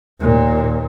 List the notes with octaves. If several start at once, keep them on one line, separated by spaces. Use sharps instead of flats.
D#2 A#2